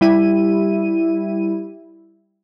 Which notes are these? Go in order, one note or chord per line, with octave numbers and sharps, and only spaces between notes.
G3 E4 D#7